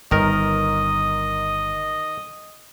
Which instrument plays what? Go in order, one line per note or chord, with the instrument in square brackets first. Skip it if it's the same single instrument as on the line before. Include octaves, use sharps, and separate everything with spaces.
[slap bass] G1 [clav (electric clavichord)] D#3 A#4 [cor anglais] D#5